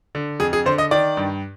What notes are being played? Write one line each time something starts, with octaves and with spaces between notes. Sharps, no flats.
D3
F2 G#4
G#4
D3 C5
D#5
D#3 D5
G2